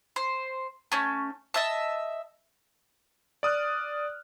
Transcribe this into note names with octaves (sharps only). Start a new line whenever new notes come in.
C5
A3 C#4
D#5 E5 A5
D5 D#6 F6 F#6